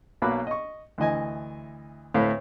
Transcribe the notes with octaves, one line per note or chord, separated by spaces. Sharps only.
B1 B2 A#3 B5 D6 F#6
D#5 C#6
D2 E3 D#5 G#5
D2 A2 A3 C4 B4 F5